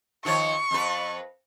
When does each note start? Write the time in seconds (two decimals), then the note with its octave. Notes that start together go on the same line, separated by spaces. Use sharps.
0.25 D#3 F3 C#5 C#6
0.71 F2 B4